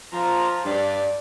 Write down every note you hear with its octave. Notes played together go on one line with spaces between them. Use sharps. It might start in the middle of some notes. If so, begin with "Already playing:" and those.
F3 A#5
G2 D5